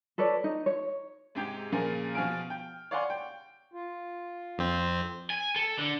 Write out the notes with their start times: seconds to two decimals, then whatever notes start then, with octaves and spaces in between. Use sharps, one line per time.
0.18 A4 B4 C#5 D5
0.44 D#4
0.66 C#5
1.35 G#2 C3 G#3 G4 G5
1.72 A#2 C#3 F3 G#4 A#4
2.15 B2 F3 F5 G#5 F6 D7
2.50 G5
2.91 C#5 D5 F5 F#5 G#5 C6
3.10 G5
3.74 F4
4.58 F2 C4
5.30 G#5
5.56 A4
5.79 D3